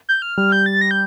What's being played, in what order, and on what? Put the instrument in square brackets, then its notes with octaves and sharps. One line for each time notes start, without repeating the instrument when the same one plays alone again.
[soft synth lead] G6
F6
[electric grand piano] G3 [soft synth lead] F6
[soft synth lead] G6
A6
A#6
G6